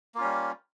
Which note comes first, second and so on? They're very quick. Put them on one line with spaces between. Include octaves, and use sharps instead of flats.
A#3 F4 C#4 G3